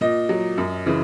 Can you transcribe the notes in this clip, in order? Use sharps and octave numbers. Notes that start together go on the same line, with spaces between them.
A#2 D#5
F#3
F#2
C#3 E3